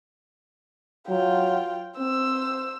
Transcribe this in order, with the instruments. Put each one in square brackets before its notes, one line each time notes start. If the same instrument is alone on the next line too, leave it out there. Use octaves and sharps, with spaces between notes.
[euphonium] F#3 [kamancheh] F4 G5
[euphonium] C4 [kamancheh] C5 E6